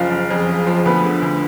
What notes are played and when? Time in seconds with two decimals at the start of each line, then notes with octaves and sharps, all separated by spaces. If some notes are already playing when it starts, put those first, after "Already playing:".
Already playing: F#1 F3 F4 F5
0.11 F#1
0.30 F2 G#4
0.48 F#1
0.67 F3
0.85 D2 B3 B4
1.04 D3
1.22 D2